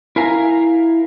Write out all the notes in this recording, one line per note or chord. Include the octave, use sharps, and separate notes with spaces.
E4 A#4 E5 F5 G#5 A#5